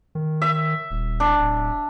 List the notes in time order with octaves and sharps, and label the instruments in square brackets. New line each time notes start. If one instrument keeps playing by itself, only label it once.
[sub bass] D#3
[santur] E5
[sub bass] D#1
[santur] D4
[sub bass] D1